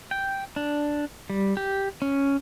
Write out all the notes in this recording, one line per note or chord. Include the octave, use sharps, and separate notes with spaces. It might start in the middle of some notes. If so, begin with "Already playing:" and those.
G5
D4
G3
G4
C#4